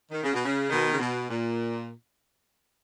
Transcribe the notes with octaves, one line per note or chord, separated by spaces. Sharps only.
D#3
C#3
B2
C#3
B2 D#3
C#3
B2
A#2